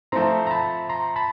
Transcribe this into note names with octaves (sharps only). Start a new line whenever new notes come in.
F3 A3 C4 A#5 C6
A#5
A5 B5
A#5 C6
A5 B5